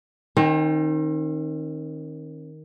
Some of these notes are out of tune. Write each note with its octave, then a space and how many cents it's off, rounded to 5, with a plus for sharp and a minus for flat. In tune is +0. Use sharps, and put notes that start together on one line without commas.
D#3 +0 C4 +45